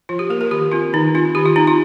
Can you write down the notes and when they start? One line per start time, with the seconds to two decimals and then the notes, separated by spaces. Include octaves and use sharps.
0.09 F3 F4
0.19 G4
0.30 A#3 A#4
0.41 A#4
0.51 D#3 G4
0.72 C4 F4
0.93 D#3 D#4
1.15 C4 F4
1.35 D#3 G4
1.46 F4
1.56 C4 D#4
1.67 F4